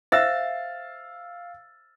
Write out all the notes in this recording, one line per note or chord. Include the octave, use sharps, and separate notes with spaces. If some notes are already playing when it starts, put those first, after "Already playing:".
C5 E5 F5 E6 A6